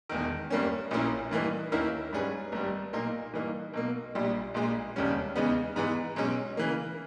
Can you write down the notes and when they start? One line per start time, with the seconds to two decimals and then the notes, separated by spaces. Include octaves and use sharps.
0.09 E1 E2 D#3
0.50 G1 G2 G3 A#3 C#4
0.91 A#1 A#2 A#3 C#4 E4
1.31 G2 E3 A#3 D#4
1.72 D#2 D#3 A#3 C#4 E4
2.13 G#2 G3 C#4 G#4 B4
2.52 G#1 G2 G3
2.93 B1 A#2 A#3 D#4 A#4
3.34 G2 E3 A#3 D#4
3.73 B1 B2 A#3
4.15 A#1 A#2 G3
4.54 A#1 A#2 G#3
4.96 E1 D#2 C#3 G3 C#4
5.36 E2 C#3 G#3 B3 D#4
5.76 G#2 E3 G#3 B3
6.16 B1 B2 G#3 C#4
6.57 C#3 E3 A#3